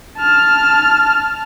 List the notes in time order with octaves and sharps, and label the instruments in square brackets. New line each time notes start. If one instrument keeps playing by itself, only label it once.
[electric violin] A5 F6